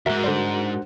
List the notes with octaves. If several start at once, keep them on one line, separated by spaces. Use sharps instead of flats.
D2 G#2 F#4 A#4 E5 F#6
D3 G3 D4 C5 F#5